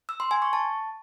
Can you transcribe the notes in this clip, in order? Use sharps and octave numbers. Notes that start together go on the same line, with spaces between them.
E6
C6
G#5
C#6
A5